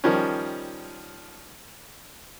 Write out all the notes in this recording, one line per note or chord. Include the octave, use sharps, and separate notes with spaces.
D#3 F3 G3 C#4